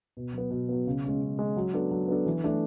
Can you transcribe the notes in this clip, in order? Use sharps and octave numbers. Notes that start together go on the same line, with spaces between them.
B2
F#3 B3
B2
F#3 B3
C#3
G#3 C#4
C#3
G#3 C#4
F#3
B3 D4 A4
F#3
B3 D4 A4
E3
A3 D4 A4